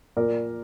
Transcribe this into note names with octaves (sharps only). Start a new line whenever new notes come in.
A#2 A#4 D5